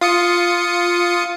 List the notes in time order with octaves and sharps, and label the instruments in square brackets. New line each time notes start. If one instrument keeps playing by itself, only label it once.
[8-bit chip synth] F4 D#6 C#7